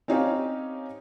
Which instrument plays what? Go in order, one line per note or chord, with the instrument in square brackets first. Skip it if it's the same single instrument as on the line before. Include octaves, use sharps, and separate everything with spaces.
[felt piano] C4 C#4 D#4 G4 F5 G#5